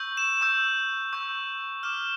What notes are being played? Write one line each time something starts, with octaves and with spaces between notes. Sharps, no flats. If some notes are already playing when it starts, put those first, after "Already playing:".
Already playing: C#6 E6 G6
E7
C#6 E6 G6
C#6 E6 G6
D6 F6 E7